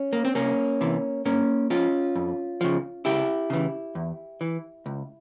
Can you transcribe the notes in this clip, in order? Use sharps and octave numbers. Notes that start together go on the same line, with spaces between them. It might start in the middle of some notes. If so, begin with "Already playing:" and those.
Already playing: C#4
A#3
C4
C2 A#3 C#4
C3 E3
G2 A#3 C#4
F3 C#4 F4
F2
C#3 F3
C#2 E4 G4
C#3 E3
E2
E3
C#2